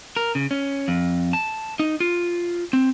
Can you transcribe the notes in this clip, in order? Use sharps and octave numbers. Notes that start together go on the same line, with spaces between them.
A#4
C#3
C#4
F2
A5
D#4
F4
C4